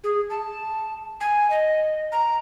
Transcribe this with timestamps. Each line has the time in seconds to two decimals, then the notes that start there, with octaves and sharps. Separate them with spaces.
0.04 G#4
0.30 A5
1.20 G#5
1.50 D#5
2.12 A#5